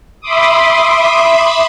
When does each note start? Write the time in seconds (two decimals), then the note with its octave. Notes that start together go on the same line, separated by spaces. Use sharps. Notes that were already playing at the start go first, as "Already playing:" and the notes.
0.21 E5 B5 C6 D6 D#6